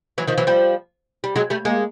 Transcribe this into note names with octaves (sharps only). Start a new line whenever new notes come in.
E3 F#3
D#3 F3
E3 F#3
F3 G3
G3
F#3 G#3
G3 A3
G#3 A#3